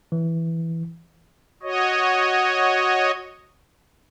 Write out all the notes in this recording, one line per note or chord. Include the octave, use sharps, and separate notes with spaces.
E3
F#4 C#5 D#5